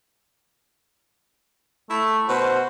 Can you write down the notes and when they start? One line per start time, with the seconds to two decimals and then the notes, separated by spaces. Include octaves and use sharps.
1.90 A3 E4
2.29 B2 F#4 C5